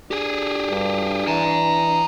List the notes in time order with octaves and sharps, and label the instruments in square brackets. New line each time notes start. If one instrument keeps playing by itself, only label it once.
[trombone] D4 [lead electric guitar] G4 G#4
[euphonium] G2
[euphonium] E3 [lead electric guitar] G#5 A#5